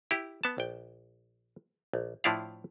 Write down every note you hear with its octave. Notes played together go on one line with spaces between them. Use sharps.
E4 G4
B3 A5
A#1 G5
A#1
A2 F3 D4 E4 D5 F5